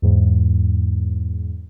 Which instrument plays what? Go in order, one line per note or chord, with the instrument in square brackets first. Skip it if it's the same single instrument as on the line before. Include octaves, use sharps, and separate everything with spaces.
[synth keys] E2 G#2